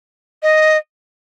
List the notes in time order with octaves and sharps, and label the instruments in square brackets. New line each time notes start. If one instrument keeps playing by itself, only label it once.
[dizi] D#5